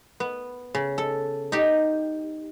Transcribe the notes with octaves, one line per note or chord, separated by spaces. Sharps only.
B3
C#3
A4
D#4 G4